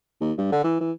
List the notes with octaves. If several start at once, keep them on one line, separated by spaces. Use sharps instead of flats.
D#2
G2
D3
E3
E3